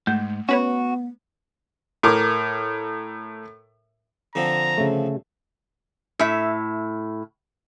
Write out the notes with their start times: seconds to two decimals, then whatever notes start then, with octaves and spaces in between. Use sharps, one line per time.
0.07 G#2 A3
0.49 B3 C#4 F#4 B4 C#5
2.03 A2 A#4 D6
4.35 D3 F3 C4 A#5
4.78 C#3 A3
6.19 A2 E5